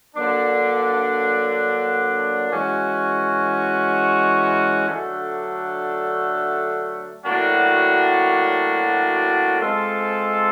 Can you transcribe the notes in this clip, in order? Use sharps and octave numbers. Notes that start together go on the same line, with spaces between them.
D3 F#3 A#3 D4
E3 G#3 C#4 F#4
D3 F#3 A3 D4
A2 F#3 A#3 D4 F#4
G#3 C4 F4 A4